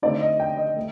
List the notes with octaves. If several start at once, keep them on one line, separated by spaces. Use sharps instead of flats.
D3 A3 C4 D#4 D5
D#5
G5
D#5
A3